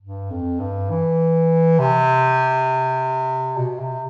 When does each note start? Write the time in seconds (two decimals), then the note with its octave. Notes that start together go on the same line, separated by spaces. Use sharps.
0.01 G2
0.31 F2
0.60 G2
0.90 E3
1.79 C3
3.57 B2
3.79 C3